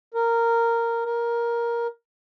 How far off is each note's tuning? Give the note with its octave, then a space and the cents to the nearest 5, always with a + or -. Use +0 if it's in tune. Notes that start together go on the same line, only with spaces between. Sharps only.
A#4 -10
A#4 +10